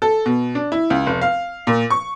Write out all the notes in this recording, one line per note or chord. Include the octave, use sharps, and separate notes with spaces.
A4
B2
D4
E4
C#2
F1
F5
A#2
C#6